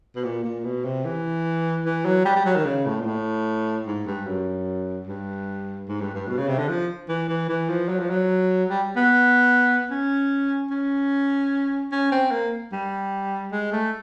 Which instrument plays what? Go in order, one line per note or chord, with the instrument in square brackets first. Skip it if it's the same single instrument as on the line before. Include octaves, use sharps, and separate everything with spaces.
[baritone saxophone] B2
A#2
A#2
B2
C3
E3
E3
F#3
G3
G3
F#3
D#3
C#3
A2
A#2
A2
G#2
G2
F#2
G2
G#2
G2
G2
B2
C#3
C3
D3
F3
E3
E3
E3
F3
F#3
F3
F#3
G3
B3
C#4
C#4
C#4
C4
A#3
G3
G#3
A3